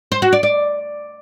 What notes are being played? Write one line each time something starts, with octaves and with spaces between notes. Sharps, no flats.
C5
F#4
D5
D5